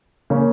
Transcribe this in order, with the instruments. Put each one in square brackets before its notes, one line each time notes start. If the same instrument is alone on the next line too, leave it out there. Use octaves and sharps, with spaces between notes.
[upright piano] C#3 A#3 C#4